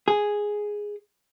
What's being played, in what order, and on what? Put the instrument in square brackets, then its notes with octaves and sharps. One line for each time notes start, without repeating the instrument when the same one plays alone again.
[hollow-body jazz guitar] G#4